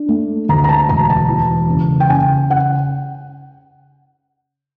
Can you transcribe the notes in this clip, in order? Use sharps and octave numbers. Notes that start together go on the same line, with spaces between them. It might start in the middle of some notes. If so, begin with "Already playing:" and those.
Already playing: D4
A3
D2 A#5
A#5
A5
E1 A#5
A5
E3
C#3
G5
C#3 G#5
F#5